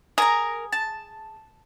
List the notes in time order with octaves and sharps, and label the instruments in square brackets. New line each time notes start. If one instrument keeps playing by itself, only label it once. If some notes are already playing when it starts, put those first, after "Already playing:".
[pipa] G#4 [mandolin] A#4 A#5
[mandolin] A5